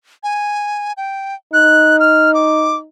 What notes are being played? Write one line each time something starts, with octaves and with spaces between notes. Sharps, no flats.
G#5
G5
D#4 F#6
F6
D6